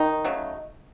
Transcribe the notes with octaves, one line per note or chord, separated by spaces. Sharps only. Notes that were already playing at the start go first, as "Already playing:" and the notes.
Already playing: D#3 D#4
C#3 F#3 A3